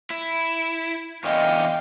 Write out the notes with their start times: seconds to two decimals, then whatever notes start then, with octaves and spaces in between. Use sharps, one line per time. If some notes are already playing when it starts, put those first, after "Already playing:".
0.10 E4
1.24 E2 D3 C#4 D#5 F5 G5